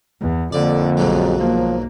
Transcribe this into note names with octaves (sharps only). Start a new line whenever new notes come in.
E2
F2 D3 A#3 D5
B1 G#2 F#3
F3 A#3